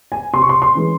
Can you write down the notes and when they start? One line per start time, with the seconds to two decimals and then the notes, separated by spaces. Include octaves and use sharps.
0.12 G#5
0.33 C3 C6
0.42 C#6
0.49 C6
0.62 C6
0.75 E3 G#3 C#4